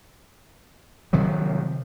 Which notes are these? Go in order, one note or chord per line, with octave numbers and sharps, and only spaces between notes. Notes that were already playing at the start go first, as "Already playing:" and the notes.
C3 D#3 F3 F#3